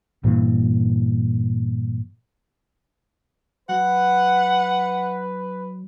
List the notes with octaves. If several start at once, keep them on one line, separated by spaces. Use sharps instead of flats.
G2 A#2 E3
F#3 B4 F#5